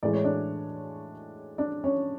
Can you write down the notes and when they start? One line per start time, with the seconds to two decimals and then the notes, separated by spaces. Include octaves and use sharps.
0.03 A2 E3 G#3 D5
0.13 C#5
0.24 D4 D5
1.58 D4 D5
1.84 C#4 C#5